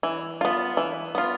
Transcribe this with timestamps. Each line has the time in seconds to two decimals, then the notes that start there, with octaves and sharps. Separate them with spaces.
0.03 E3
0.41 B3 F4
0.77 E3
1.15 B3 F4